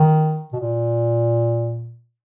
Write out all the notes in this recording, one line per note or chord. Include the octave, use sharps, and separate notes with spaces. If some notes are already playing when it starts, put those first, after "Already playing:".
Already playing: D#3
B2
A#2